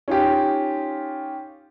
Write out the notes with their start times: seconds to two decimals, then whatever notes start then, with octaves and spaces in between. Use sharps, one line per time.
0.08 C#4 D#4 F4 G4